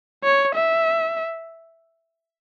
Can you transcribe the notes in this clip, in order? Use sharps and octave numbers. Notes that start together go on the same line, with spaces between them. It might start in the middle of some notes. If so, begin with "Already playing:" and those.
C#5
E5